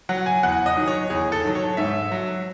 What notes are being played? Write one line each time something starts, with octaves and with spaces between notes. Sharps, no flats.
F#3 F#5
G#5
E2 F#5
D#5
D#3 F#3
C#5
E2 G#4
A4
D#3 F#3
C#5
G#2 E5
F#3